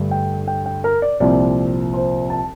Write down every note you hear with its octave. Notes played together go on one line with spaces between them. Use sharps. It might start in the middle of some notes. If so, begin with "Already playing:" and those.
Already playing: G2 D3 A3
G5
G5
G5
A#4
D5
C2 A#2 F3 C4 D5
C5
A5